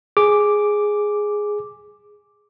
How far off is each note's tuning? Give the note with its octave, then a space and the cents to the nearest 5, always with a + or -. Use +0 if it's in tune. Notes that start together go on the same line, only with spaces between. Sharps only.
G#4 +0 D6 +0